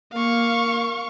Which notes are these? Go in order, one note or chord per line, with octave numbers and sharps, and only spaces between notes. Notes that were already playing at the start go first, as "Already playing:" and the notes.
A#3 F5 C#6